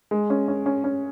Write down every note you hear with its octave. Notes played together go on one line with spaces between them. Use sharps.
G#3
C#4
C#4
C#4
C#4